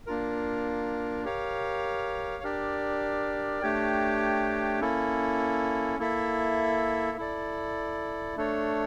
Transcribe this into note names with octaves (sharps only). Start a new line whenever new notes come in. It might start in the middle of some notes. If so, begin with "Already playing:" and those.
A#3 D4 F4 A#4
G4 A#4 C#5 F5
D4 G4 A#4 D5
A3 D4 G4 C#5 G5
A#3 C#4 E4 A4
A#3 E4 A4 E5
E4 A4 D5
A3 D4 A4 C#5